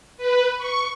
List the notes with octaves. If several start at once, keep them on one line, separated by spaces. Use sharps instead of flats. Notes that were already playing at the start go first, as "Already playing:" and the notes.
B4
C#6